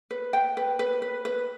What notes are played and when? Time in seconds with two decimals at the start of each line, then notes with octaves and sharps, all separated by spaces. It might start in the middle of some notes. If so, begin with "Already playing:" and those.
0.11 B4
0.33 G5
0.57 B4
0.79 B4
1.02 B4
1.25 B4